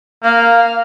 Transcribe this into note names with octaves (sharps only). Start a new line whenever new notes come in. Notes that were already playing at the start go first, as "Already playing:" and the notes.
A#3 F5